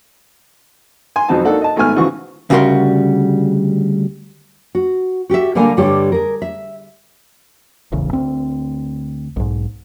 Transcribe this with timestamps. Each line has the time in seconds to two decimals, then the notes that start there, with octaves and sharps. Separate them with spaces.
1.16 G#5 C6
1.29 B1 F2 C4 F#4 A5
1.45 A#3 D4 D#4 F#4 A4 F#5
1.62 D#5 A5
1.76 G#1 A3 B3 G#5 F6
1.96 C#3 E3 F3 F#4 C#6
2.50 D2 C#3 G3 F#4 A#4 C6
4.75 F#4
5.30 F#4 G4 A4 E5
5.55 D3 G3 A#3 A4 A#4 G#5
5.77 G2 D3 G3 G4 A4 C#5
6.12 G#4 A#4
6.42 E5
7.92 D1 A1 E2 C#3
8.13 D2 C4
9.36 B1 G#2